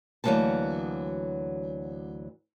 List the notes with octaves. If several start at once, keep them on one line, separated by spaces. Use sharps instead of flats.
D2 E3 F#3 A#3 B3 A5